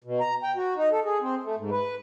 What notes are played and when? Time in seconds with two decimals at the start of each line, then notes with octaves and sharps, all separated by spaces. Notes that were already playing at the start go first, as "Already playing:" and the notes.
0.04 B2
0.20 A#5
0.43 G5
0.56 F#4
0.76 D#4
0.92 A4
1.05 G#4
1.21 C4
1.43 A3
1.57 G#2
1.71 B4